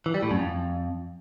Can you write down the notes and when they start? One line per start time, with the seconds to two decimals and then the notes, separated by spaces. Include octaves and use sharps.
0.06 E3
0.14 G3
0.23 A2
0.31 F#2
0.39 F2